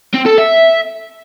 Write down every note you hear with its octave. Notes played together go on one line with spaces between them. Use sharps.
C4
A4
E5